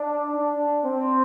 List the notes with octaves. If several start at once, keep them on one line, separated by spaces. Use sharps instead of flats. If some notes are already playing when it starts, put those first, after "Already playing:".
Already playing: D4
D4
C4